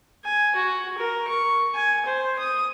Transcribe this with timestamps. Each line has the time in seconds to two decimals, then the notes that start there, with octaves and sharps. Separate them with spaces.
0.25 G#5
0.56 F#4
0.98 A#4
1.28 C#6
1.75 G#5
2.06 C5
2.39 D#6